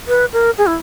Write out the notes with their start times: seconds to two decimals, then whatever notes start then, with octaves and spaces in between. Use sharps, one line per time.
0.08 B4
0.33 A#4
0.58 G#4
0.67 E4